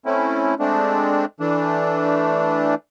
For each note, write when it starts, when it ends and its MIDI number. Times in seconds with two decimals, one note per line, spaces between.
0.06 0.54 57
0.06 0.54 60
0.06 0.54 61
0.06 0.54 64
0.60 1.25 56
0.60 1.25 57
0.60 1.25 60
0.60 1.25 62
1.40 2.75 52
1.40 2.75 57
1.40 2.75 62